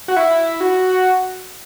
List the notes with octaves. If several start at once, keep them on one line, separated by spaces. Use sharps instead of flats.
F#4
E4
F#4